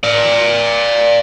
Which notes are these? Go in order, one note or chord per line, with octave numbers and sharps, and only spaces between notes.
D5 F5